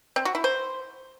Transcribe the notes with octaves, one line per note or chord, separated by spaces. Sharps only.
C4
F#4
E4
C5